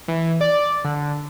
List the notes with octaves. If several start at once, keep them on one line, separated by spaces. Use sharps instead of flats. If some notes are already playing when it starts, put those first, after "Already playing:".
E3
D5
D3